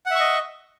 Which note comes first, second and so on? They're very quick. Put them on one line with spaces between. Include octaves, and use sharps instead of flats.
F#5 E5 C#6 D#5